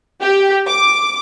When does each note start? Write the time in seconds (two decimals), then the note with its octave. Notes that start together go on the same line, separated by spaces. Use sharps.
0.21 G4
0.67 D6